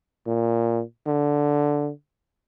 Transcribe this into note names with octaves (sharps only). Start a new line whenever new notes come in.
A#2
D3